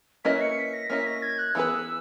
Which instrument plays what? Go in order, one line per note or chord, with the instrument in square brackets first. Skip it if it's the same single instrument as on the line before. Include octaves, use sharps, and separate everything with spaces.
[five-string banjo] A#3 C#4 E4 B4 D#5 [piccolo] B6
[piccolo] C#7
B6
A#6
[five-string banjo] A#3 C#4 E4 B4 D#5 [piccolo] B6
[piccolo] A#6
G#6
F#6
[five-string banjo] E3 B3 E4 G#4 B4 [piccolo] E6